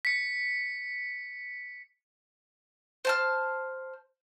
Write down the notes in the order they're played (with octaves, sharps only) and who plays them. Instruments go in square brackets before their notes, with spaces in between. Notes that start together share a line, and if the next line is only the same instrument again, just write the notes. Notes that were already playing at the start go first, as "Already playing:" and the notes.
[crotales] B6 C#7
[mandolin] C5 A5 F6